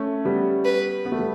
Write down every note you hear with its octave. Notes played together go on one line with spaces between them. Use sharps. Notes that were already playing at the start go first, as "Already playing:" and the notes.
Already playing: A3 C#4
G3 B3
B4
B3
A3
G3